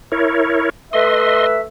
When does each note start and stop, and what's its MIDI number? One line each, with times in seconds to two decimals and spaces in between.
0.12 0.70 64
0.12 0.70 70
0.12 0.70 73
0.93 1.63 57
0.93 1.63 71
0.93 1.46 75
0.93 1.63 76
0.93 1.46 84